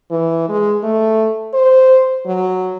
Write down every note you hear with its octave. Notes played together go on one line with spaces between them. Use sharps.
E3
G#3
A3
C5
F#3